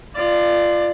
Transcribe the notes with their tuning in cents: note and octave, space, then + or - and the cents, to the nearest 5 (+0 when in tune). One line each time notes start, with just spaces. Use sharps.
F4 -15 D5 +20